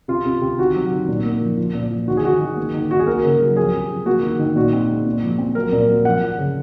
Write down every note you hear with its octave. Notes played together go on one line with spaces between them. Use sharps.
C3 F4
C3
C3
D#3 F#4
F#3
D#3
A#2
A#3
F3
F3
A#2
F3
D#3 F#4
G#4
D#3 F#4
D#3
A#3
D#3
D#3 F#4
G#4
A#3 A#4
C#3
F#3
F3 G#4
C3
F3
A#3 F#4
D#3
D#3
A#2 F#4
C4
G#3
A#2
F3
C4
F#3 A#4
A#2
F#3
F3 F#5
F3
C#3